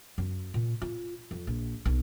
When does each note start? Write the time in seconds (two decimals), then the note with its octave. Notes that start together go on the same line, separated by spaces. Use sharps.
0.18 F#2
0.54 A#2
0.82 F4
1.31 F2
1.47 A#1
1.86 B1